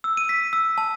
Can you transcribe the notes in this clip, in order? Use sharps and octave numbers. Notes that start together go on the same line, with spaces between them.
E6
D#7
B6
E6
A5